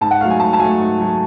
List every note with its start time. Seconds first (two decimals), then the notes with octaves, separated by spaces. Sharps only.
0.01 G#2 A5
0.11 F#5
0.21 F#3 A3 F5
0.30 G#5
0.40 G#2 A5
0.53 A5
0.60 F#3 A3 G#5
0.79 G#2
1.00 F#3 A3